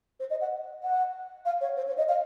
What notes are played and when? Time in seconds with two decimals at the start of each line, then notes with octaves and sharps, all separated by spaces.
0.19 C5
0.30 D#5
0.40 F#5
0.82 F#5
1.45 F5
1.60 C#5
1.76 C5
1.87 C#5
1.97 D#5
2.08 F5